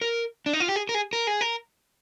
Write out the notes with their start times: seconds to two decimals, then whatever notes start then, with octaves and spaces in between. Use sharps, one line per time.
0.01 A#4
0.46 D4
0.53 D#4
0.60 F4
0.68 G4
0.76 G#4
0.89 A#4
0.95 G#4
1.13 A#4
1.27 G#4
1.41 A#4